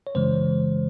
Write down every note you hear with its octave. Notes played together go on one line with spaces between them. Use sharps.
C#5
F#2 C#3 E3 G#3 C5